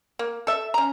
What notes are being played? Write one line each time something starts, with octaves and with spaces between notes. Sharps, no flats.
A#3
A4 E5
C#4 A#5